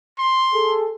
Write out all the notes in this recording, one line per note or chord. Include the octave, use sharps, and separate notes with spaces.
C6
G#4 A4